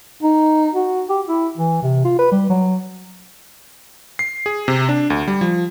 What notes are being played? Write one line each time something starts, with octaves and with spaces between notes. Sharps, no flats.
D#4
F#4
G4
E4
E3
C3
F4
B4
G3
F#3
C7
G#4
C3
D4
D2
G3
F3